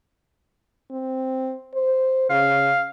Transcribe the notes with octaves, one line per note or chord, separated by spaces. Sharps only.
C4
C5
C#3 F5